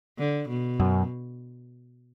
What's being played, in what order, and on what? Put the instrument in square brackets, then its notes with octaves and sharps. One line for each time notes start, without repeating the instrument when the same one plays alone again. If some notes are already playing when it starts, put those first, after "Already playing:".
[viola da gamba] D3
B2
[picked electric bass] F#2